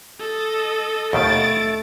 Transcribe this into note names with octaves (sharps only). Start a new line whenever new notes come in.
A4 D#5
D#2 B2 D#3 A3 A6 D7